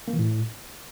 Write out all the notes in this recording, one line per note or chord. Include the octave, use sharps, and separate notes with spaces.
A#3
E3
A2